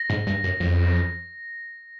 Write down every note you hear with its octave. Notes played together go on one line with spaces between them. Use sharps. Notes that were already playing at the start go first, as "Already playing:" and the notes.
Already playing: A#6
G#2
G2
F#2
F2